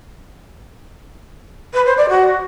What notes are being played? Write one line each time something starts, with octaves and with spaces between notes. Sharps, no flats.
B4
C5
D5
F#4